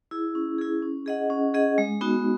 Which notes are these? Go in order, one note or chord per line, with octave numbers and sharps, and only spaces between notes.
E4 G#4
C#4
E4 G#4
C#4
G#4 D#5 F#5
C#4
G#4 D#5 F#5
G#3
B3 D#4 F#4